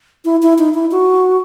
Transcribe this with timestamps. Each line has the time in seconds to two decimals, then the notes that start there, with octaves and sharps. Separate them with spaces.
0.25 E4
0.42 E4
0.58 D#4
0.74 E4
0.91 F#4